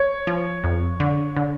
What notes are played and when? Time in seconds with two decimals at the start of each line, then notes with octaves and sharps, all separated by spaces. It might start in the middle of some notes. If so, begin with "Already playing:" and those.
Already playing: C#5
0.27 F3
0.64 F2
1.00 D3
1.37 D3